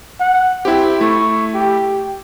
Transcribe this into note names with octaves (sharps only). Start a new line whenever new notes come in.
F#5
C4 E4 G4
A3 E4 C#6
G4